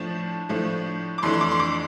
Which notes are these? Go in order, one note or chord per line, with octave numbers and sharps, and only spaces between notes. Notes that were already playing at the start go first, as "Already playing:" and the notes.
Already playing: A2 F3 A3 D4 A5
A2 F3 A3 D4
D6
F2 E3 A3 D4 C6
C6
D6
C6
D6